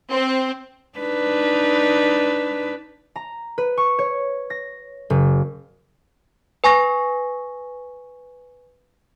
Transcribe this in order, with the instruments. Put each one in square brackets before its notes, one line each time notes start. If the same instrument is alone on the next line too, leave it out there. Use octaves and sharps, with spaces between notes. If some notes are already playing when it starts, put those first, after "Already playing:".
[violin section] C4
[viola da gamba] D4 D#4 B4
[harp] A#5
B4
C#6
C#5
A#6
F#1
[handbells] B4 G#5 C#6 A#6